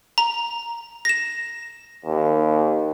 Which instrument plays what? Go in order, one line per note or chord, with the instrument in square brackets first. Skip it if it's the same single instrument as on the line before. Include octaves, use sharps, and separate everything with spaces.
[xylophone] A#5
A#6 E7
[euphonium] D#2